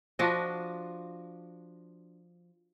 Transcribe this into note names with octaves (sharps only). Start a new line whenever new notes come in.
F3 D4 F#4 D#5